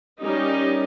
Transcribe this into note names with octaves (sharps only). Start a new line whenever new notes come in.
G3 C#4 D#4 G4 A#4 D#5